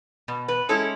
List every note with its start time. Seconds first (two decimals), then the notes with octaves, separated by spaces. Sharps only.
0.28 B2
0.48 B4
0.69 G#3 C#4 E4 A4